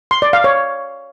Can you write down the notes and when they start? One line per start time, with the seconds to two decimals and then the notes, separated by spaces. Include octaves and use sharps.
0.11 C6
0.22 D5
0.33 F5
0.44 C#5